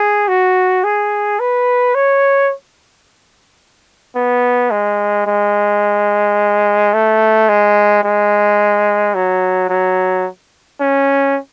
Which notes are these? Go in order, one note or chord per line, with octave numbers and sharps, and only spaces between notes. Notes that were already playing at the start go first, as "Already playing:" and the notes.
Already playing: G#4
F#4
G#4
B4
C#5
B3
G#3
G#3
A3
G#3
G#3
F#3
F#3
C#4